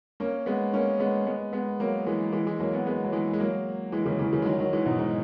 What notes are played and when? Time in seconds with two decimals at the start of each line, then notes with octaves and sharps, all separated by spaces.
0.20 A#3 C#4
0.46 G#3 B3
0.74 A#3 C#4
1.00 G#3 B3
1.27 G#3 B3
1.53 G#3 B3
1.80 F#3 A#3
2.06 E3 G#3
2.33 E3 G#3
2.47 E3 G#3
2.60 F#3 A#3
2.73 G#3 B3
2.86 G#3 B3
3.04 F#3
3.12 E3 G#3
3.33 G#3
3.40 F#3 A#3
3.92 E3 G#3
4.06 C#3 E3
4.19 C#3 E3
4.32 C#3 E3
4.42 G#3
4.46 D#3 F#3
4.59 D#3 F#3
4.73 E3 G#3
4.86 G#2 B2
4.99 G#2